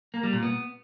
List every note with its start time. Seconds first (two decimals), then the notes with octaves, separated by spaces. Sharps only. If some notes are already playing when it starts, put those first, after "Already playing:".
0.14 A#3
0.23 G3
0.33 A#2
0.43 B3